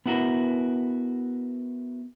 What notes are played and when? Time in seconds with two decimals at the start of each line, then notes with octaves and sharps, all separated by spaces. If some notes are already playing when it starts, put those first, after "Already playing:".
0.06 B3 E4 F#4 G4 A#4 B4